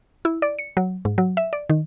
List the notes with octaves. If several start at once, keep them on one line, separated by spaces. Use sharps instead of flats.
E4
D5
C#7
F#3
G#2
F#3
E5
D5
D#3